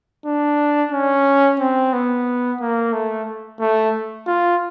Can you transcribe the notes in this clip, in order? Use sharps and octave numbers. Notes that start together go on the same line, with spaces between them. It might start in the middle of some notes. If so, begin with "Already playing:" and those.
D4
C#4
C4
B3
A#3
A3
A3
F4